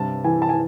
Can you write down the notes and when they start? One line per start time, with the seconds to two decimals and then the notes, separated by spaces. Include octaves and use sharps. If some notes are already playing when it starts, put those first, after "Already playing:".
Already playing: G2 C3 A5
0.24 E3 G#5
0.42 A5
0.49 G#5